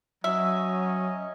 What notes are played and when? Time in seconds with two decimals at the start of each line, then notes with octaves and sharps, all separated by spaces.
0.24 F#3 C#4 D#5 E5